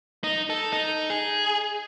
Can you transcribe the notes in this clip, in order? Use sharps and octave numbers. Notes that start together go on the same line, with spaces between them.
D#4
A4
D#4
G#4